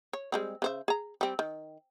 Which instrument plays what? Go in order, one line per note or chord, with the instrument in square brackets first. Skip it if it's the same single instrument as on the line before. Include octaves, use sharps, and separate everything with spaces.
[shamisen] C#5
G3 G#3 C4
C#3 C5 E5
G#4 A#5
G3 C4
D#3